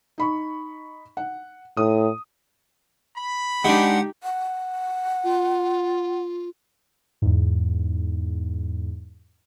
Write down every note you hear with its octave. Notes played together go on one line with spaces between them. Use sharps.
D#4 B5 C#6
F#5
A2 D#6
B5
G#3 D4 D#4 G4 F#5
F#5
F4
E2 G#2